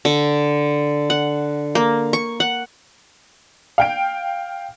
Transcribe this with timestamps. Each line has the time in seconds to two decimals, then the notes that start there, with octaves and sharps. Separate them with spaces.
0.05 D3
1.10 F#5
1.75 A#3
2.13 C#6
2.40 F#5
3.78 F5 G5 D7